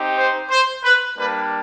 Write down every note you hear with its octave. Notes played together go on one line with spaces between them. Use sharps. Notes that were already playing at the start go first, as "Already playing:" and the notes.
Already playing: C4 D#4 G4
C5
C5
B4
G3 A#3 D4 B4